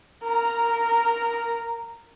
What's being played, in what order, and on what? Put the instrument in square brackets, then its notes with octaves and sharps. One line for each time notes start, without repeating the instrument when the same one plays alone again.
[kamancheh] A#4 A#5